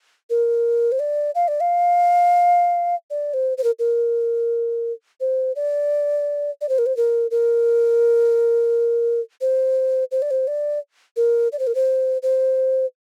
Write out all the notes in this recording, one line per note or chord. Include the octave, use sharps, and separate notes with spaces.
A#4
C5
D5
F5
D5
F5
D5
C5
C5
A#4
A#4
C5
D5
D5
C5
A#4
C5
A#4
A#4
C5
C5
D5
C5
D5
A#4
D5
C5
A#4
C5
C5